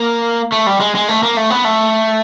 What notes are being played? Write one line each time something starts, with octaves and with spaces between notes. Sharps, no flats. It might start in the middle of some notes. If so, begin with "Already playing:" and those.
Already playing: A#3
A3
G3
G#3
G#3
A3
A#3
A3
B3
A3